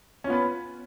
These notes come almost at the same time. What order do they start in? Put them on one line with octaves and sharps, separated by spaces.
C#4 F4 B3 B4